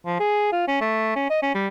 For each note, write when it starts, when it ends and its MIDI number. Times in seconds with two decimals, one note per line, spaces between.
0.06 0.18 53
0.20 0.48 68
0.52 0.67 65
0.68 0.78 61
0.81 1.12 57
1.16 1.27 61
1.30 1.39 75
1.42 1.55 61
1.55 1.68 55